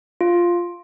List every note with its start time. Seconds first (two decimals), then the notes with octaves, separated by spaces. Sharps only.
0.21 F4